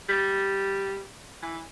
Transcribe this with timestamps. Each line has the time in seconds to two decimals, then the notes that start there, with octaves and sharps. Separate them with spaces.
0.09 G3
1.43 E3